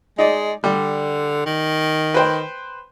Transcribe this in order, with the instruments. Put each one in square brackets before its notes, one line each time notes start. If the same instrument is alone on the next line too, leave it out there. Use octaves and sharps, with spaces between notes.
[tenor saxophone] G#3 [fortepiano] D#4 D5
[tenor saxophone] D3 [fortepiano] G3
[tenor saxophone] D#3
[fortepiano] B4 C5 G5